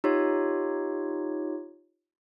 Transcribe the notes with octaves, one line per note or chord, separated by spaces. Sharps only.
D#4 F4 G4 C#5